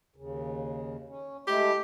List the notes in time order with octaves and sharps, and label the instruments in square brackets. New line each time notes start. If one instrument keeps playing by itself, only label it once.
[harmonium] D#2 C#3
C#4
[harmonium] G#3 A3 E4 [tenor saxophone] G4